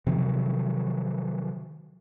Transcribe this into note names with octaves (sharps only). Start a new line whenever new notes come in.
C3 D#3 F3 F#3